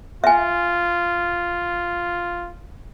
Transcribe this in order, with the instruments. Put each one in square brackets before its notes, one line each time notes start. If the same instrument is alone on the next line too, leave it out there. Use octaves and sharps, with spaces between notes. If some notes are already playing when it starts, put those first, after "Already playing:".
[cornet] F4 [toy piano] E5 G#5